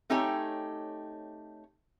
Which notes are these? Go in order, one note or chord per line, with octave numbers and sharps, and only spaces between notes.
A3 C4 D#4 G4 C#5 G#5